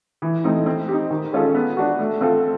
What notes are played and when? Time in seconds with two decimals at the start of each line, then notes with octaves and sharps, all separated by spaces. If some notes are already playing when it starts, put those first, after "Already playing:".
0.22 E3
0.44 A3 C4 D#4
0.66 C4
0.88 D#4 G4
1.11 D#3
1.32 G#3 C#4 F4 A4
1.55 B3
1.77 D4 F#4
1.99 A3
2.21 C4 F4 A4